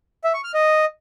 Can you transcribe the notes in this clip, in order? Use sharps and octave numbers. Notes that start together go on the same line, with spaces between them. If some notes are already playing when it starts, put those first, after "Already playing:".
E5
C#6
F6
D#5